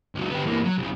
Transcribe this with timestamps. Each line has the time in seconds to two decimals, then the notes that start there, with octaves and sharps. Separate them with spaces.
0.15 C#2 F#3
0.30 B3 G4
0.45 E3 A#3
0.64 F#3
0.78 C2 C#3